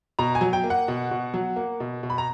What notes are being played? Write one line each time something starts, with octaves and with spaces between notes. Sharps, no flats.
B2 A#5
G#5
F#3
G5
A#3
F#5
B2
B2
F#3
A#3
B2
B2
B5
A#5